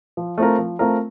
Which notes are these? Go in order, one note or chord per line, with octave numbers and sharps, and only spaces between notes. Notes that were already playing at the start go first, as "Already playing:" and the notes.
F3
A3 C4 F4 A#4
F3
A3 C4 F4 A#4